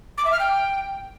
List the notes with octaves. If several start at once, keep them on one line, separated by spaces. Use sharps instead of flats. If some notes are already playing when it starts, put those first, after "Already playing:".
D6
E5
F6
G5